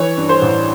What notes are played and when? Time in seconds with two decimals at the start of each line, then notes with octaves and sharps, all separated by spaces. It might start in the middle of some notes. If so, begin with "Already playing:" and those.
Already playing: E3 C#5
0.17 G2
0.29 C5
0.42 A1